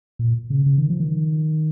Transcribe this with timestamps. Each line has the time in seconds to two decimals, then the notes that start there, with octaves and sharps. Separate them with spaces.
0.19 A#2
0.50 C#3
0.66 C#3
0.78 D#3
0.90 F3
1.00 D#3